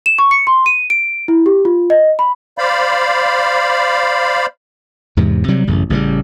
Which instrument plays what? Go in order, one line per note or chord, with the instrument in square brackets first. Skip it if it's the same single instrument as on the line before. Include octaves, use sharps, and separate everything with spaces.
[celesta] E7
C#6
C#7
C6
D#7
D7
E4
G4
F4
D#5
B5
[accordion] C5 D5 F5 B5
[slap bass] E2 G#2 C3
C3 F#3 G3
A1 F#2 C#3
A1 C#3 E3 G3